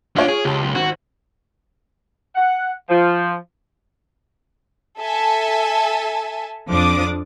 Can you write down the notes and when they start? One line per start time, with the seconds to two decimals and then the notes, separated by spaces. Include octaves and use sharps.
0.16 D4 F4 F#4 C#5 D7
0.28 G#4
0.45 C#2 G4 A5
0.63 B1
0.75 G#1 F#4
2.35 F#5
2.89 F3
4.99 A4 E5 G#5 A5
6.70 F2 F3 D4 D6 D#6